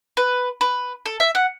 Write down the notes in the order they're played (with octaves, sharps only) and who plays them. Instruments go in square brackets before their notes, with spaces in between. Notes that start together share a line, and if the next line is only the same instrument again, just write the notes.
[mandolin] B4
B4
A4
E5
F#5